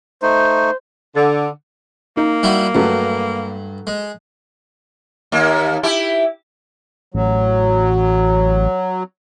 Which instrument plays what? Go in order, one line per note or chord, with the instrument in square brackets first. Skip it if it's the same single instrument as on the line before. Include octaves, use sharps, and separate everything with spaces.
[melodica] A3 D#4 [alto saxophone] C5
[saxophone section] D3
[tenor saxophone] A#3 [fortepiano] D#4
[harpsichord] G3 E4 F#4
[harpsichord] G2 [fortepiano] F#3 A3
[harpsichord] G#3
[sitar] D#2 A#3
E4 G4
[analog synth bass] A1 [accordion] F#3